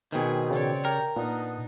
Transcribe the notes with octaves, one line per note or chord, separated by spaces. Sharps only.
B2 D#3 C4 G#4 G#5
C#3 C#5 D5
G4 A#4
A#2 B3 D4 D#4